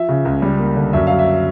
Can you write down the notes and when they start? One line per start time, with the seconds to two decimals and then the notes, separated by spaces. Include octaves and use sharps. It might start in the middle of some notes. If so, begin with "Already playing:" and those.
Already playing: F3 E5
0.09 C#3
0.25 C#2
0.42 G3
0.59 A#3
0.76 D3
0.93 F#2 E5
1.07 F#3 F5
1.19 E5